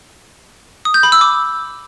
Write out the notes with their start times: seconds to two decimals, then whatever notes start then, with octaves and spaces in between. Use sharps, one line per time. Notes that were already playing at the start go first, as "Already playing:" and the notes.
0.85 D#6
0.94 G6
1.03 B5
1.12 E6
1.21 D6